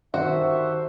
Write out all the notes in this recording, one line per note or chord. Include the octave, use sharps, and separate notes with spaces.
D#3 F#4 G4 A4 C5 E5